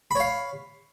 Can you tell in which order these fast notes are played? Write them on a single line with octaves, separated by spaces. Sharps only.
B5 C#5 F5